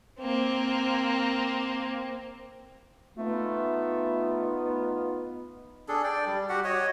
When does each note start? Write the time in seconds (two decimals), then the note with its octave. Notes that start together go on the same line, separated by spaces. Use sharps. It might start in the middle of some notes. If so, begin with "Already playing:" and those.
0.20 A#3 C4
3.17 A3 B3 D#4 F4
5.88 D4 G#4 A4
6.03 D5 G5
6.26 G3
6.49 F#4 G4 F#5
6.64 F#4 C#5 D#5